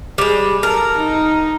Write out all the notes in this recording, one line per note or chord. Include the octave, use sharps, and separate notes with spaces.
G3 G#3
A4 A#4
D#4